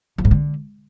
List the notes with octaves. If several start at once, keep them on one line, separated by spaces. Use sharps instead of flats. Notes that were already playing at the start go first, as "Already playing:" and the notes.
F3
G#2
D3